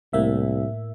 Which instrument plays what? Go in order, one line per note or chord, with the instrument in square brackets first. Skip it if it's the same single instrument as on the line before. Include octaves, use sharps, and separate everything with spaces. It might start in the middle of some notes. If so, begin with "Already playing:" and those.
[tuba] C2 [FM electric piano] A2 A#3 E5